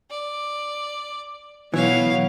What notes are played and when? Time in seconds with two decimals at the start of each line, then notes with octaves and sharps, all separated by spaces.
0.11 D5
1.74 B2 E3 F#3 C#5 F5